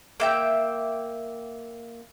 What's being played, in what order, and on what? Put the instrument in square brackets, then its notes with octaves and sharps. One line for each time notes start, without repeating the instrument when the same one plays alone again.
[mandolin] A#3 E5 G5